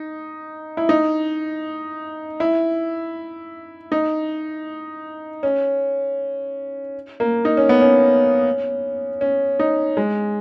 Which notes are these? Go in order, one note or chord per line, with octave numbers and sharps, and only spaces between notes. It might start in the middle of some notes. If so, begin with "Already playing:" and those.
Already playing: D#4
E4
D#4
E4
D#4
C#4
A#3
D#4
C#4
B3
C#4
C#4
D#4
G#3